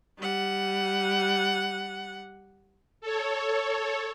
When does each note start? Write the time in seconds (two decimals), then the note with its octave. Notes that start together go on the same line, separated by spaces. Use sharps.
0.18 G3 F#5
3.01 A4 C#5